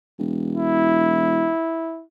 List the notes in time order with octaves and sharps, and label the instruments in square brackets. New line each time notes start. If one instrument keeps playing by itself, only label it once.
[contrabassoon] E1
[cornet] E4